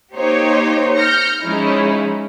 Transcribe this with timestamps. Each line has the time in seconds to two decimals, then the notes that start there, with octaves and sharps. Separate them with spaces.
0.15 A#3 D#4 G4 C5 C#5
0.96 F6 G6 A#6 C#7
1.43 F3 G#3 C#4 D#4 E4